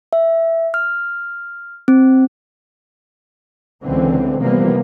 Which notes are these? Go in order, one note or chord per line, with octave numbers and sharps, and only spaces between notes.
E5
F6
C4
C#2 D3 E3 C4
C3 E3 F3 G3 A#3 B3